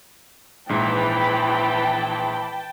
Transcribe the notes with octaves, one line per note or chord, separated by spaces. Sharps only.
A#1 G#2 E3 G5 A5 B5